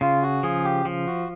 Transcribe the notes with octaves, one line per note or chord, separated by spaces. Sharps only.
C#3 F4
F#4
F3 G#4
G4
F3
F#4